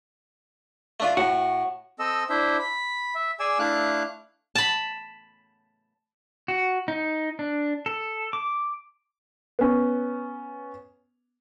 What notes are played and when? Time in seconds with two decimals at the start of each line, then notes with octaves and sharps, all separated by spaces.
1.00 A3 D4 F4
1.17 A2 F#4
1.99 C4 A4 D#5 E6
2.30 D4 E4 C5 E5
2.59 B5
3.15 E5
3.40 G#4 D5 G#5 E6
3.59 A3 D4 E4 F5 F#6
4.55 A5 B5
6.48 F#4
6.88 D#4
7.39 D4
7.86 A4
8.33 D6
9.59 B3 C#4